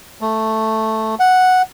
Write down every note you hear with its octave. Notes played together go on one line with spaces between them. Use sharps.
A3
F#5